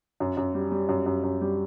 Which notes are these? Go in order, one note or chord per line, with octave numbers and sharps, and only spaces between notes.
F#2
F#2
G3
G3
F#2
F#2
F#2
G3